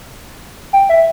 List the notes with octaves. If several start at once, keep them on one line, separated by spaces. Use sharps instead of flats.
G5
E5